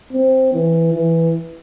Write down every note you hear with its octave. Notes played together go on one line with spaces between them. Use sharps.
C4
E3
E3